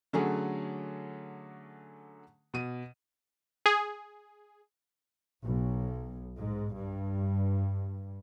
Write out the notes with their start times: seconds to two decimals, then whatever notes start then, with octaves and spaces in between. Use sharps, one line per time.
0.13 D3 F#3 A3 C#4 G#4
2.54 B2 D#7
3.66 G#4
5.44 B1
6.36 G#2
6.74 G2